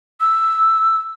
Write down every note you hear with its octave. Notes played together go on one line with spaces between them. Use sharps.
E6